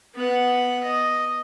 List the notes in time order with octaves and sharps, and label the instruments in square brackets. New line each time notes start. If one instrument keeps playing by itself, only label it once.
[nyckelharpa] B3 F#5
D#5